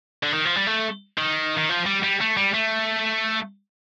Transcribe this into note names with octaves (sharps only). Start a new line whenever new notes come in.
D3
D#3
F3
G3
A3
D#3
D#3
F3
G3
G3
A3
G3
A3